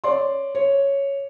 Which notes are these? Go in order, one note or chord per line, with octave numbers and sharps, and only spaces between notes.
C#5 D5 C6
C#5